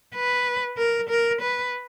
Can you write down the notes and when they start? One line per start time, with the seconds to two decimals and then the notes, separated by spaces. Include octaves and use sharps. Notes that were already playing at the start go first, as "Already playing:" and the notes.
0.15 B4
0.78 A#4
1.09 A#4
1.41 B4